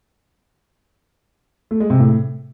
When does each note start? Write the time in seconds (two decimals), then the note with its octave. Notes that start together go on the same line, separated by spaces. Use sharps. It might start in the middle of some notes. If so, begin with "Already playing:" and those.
1.71 A3
1.80 G#3
1.90 C3
1.99 A2